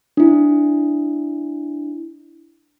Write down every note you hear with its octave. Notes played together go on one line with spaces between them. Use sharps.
D4 E4